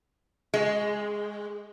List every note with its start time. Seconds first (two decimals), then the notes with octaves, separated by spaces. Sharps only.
0.54 G#3